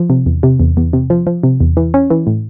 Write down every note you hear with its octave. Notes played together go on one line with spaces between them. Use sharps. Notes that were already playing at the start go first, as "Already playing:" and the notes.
Already playing: F3
C3
E2
C3
E2
E2
C3
F3
F3
C3
E2
E3
C#4
E3
A2